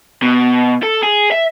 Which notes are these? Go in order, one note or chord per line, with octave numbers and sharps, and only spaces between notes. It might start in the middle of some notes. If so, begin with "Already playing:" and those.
B2
A4
G#4
E5